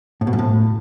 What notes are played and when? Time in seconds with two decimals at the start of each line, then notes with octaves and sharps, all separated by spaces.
0.21 A2
0.27 B2
0.33 F#2
0.39 A2